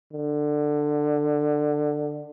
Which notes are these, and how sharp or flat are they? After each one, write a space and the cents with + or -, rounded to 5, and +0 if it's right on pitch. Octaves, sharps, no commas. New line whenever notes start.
D3 +15